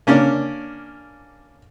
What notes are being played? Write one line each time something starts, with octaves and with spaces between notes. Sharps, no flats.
A#3 C#4 D4 D5